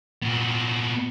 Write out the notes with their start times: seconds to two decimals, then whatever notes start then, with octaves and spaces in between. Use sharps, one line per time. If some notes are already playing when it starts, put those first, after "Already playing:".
0.22 A#2 B3